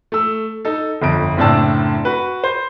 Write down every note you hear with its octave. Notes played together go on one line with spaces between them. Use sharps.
A3 E6
D#4 A4
G1 F2 D7
F#1 A2 C4 D4 A5 E6
F#4 B4
C5